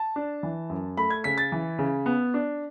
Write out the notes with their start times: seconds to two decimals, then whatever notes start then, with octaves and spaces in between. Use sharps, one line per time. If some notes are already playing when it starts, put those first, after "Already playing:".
Already playing: A5
0.16 D4
0.43 E3
0.70 F#2
0.97 A3 B5
1.10 G#6
1.24 C#3 B6
1.38 A6
1.52 E3
1.79 C#3
2.06 B3
2.34 D4